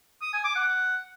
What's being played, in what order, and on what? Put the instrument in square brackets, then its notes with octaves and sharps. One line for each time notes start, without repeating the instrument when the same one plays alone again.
[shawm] D#6
G#5
D6
F#5